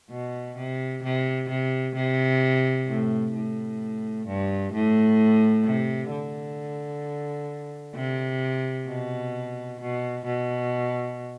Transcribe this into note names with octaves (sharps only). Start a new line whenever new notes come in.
B2
C3
C3
C3
C3
A2
A2
G2
A2
C3
D3
C3
B2
B2
B2